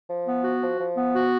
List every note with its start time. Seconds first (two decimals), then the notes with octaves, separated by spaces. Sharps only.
0.09 F3
0.27 B3
0.44 F#4
0.62 F3
0.79 F3
0.97 B3
1.14 F#4